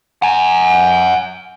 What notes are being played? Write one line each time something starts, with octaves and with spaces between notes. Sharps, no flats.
F#5 G#5